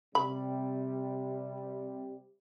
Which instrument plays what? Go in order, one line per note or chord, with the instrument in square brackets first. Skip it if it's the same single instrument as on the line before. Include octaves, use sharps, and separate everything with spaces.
[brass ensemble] C3 G3 [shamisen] B5